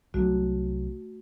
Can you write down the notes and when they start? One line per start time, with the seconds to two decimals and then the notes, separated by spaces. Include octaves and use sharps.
0.14 C2 F#3 A3 F#4